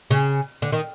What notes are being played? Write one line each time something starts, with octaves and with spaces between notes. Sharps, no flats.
C#3
D3
D#3